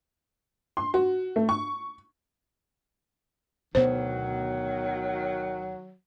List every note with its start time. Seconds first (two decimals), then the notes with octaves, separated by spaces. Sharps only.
0.77 C6
0.94 F#4
1.36 A3
1.49 C#6
3.75 D2 B2 D#3 F#3 B3 C5